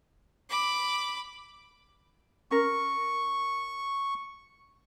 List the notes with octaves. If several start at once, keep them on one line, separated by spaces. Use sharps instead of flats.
B5 D6
C#4 A#4 C#6